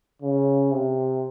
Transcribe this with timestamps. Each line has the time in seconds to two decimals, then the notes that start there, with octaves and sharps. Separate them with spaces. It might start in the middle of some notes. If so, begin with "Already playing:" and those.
0.22 C#3
0.71 C3